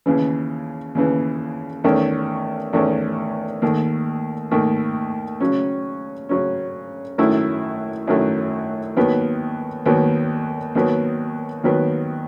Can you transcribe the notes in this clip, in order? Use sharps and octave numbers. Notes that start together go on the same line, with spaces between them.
D#2 C#3 E3
D#2 C#3 E3
E2 D#3 A3 C#4
E2 D#3 A3 C#4
D#2 D#3 A3
D#2 D#3 A3
C#3 F#3 C#4
C#3 F#3 C#4
F#2 D#3 F#3 A3 E4
F#2 D#3 F#3 A3 E4
D#2 D#3 F#3 B3
D#2 D#3 F#3 B3
D#2 D#3 F#3 B3
D#2 D#3 F#3 B3